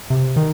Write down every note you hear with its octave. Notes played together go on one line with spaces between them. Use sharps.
C3
D#3